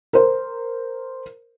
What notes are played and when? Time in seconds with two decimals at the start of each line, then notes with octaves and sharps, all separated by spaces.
0.13 A#4 C5